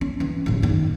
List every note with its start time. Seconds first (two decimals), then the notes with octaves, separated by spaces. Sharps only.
0.01 C#4
0.20 E3 C#4
0.46 D1 A1
0.62 F#1 D#3